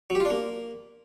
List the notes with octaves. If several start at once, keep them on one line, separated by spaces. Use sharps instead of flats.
F#3
G4
F4
D4
A#3